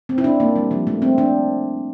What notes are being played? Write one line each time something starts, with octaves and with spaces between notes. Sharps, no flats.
C4
E4
D4
A#3
G3
F3
A3
C4
D4